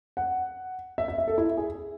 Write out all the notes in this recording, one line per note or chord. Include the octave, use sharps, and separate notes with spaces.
F#5
E5
E5
E5
A4
E4
G#4